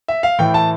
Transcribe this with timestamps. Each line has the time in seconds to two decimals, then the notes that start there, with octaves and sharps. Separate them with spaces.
0.08 E5
0.23 F5
0.39 A2 E3 G5
0.54 A5